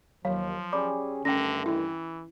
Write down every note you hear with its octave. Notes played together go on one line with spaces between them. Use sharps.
D#2 F3 F#3 F5
C#4 G4 G#4 D5 B5 D6
G2 D3 D#3 A3 C#4 G5 A#6
E3 E4